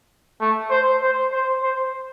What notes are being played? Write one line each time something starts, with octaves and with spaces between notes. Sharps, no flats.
A3
C5
C5
C5
C5